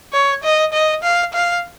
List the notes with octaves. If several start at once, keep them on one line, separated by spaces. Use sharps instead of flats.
C#5
D#5
D#5
F5
F5